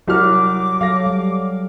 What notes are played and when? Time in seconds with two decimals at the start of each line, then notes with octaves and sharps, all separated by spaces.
0.08 C2 F#3 F#4 D6 F6
0.81 F#3 A4 F5 A#6
1.06 G3